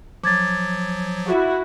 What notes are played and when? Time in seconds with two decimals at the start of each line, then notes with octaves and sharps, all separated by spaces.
0.24 F3 F#3 D6 G#6 A6
1.27 E4 F#4